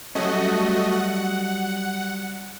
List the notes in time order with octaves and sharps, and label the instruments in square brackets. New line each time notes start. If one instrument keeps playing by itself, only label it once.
[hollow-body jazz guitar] F#3 G3 C#4 [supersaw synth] A3 F#4 D#5
[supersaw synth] F#5